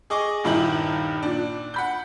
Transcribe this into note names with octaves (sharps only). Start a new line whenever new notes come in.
G#4 D#5 C#6 D6
D#1 G2 D#3 D#4 E4 F#7
A#2 D4
F#5 B5 G6